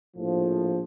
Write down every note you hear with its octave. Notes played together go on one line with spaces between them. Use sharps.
A#1 A2 F3